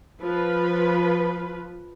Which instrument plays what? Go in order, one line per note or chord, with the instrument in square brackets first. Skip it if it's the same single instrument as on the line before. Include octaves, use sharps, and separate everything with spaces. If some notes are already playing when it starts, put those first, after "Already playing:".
[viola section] F3 B4